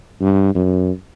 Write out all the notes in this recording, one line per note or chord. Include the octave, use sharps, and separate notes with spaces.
G2
F#2